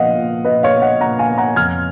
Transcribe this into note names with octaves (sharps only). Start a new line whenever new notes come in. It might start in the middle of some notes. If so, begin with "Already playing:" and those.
Already playing: A#2 F3 B3 D#5 F5 F#5
A#2
A#2 B4 D#5
C#5 F5
B3
D#5 F#5
A#2 F#5 A#5
F5 G#5
B3
F#5 A#5
F2 F6 G#6